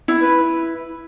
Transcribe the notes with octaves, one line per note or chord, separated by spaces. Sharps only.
E4
B4